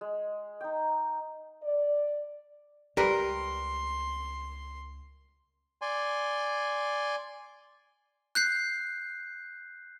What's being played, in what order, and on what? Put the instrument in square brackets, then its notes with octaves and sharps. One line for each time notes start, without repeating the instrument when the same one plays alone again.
[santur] G#3
D#4 G5
[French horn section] D5
[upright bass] C#2 [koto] G3 B4 [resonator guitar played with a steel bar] A#4 [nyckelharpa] C6
[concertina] D5 G#5 C6
[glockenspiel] F#6 G6 C7